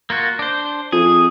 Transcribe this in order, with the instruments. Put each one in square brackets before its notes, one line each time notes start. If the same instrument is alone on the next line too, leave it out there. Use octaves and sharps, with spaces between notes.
[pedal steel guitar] A#3 F4 F#4
D4 C5
[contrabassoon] F2 [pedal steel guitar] G#4